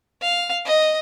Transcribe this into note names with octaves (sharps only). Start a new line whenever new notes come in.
F5
D#5